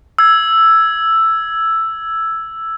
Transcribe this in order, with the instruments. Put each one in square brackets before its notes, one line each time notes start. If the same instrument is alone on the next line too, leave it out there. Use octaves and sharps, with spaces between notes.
[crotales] E6 G#6